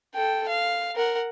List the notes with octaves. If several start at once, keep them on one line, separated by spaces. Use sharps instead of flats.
A4 G5
F5
A#4 F#5